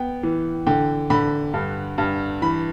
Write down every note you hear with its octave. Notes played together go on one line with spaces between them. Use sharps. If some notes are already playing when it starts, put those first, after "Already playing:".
Already playing: B3 G5
E3
D3 G5
D3 B5
G2
G2
E3 B5